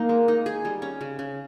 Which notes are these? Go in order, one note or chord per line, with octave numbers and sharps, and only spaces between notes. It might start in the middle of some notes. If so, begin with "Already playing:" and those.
Already playing: A#3 D#4
G#3
D#4
G#4
G3
C#4
C#3
C#3